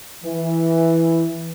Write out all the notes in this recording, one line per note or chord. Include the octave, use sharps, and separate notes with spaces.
E3